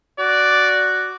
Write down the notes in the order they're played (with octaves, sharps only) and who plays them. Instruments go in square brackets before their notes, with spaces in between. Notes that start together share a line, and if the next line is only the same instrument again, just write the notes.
[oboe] F#4 [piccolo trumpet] D5